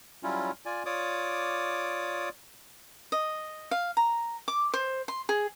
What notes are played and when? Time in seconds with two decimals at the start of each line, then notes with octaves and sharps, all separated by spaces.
0.23 F#3 G3 C#4 E4 F4
0.66 F4 D5 G#5
0.86 F4 C#5 D5 D6 D#6
3.12 D#5
3.71 F5
3.97 A#5
4.48 D6
4.74 C5
5.08 C6
5.29 G#4